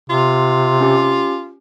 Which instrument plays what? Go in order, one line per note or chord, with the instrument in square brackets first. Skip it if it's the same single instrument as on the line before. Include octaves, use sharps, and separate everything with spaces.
[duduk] C3 [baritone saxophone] F4
[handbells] C#4 G4